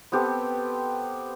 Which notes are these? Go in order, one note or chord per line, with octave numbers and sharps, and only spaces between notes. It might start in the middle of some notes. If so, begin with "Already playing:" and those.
B3 C4 G4 A4